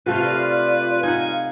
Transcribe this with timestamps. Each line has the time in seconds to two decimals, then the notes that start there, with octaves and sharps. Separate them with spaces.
0.06 C3 A3 F4 B4
0.24 D5
1.03 D#4 F5 F#5 G#5